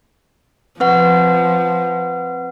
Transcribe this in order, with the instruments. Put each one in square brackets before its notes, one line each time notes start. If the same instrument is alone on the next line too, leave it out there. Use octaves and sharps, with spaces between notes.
[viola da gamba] F3 [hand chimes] C4 B4 F#5